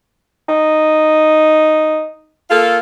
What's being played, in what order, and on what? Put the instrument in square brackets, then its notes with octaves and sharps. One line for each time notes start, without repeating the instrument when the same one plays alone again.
[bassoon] D#4
[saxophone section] A#3 F4 A4